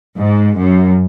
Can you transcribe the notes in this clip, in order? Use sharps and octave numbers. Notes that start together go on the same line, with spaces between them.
G#2
F#2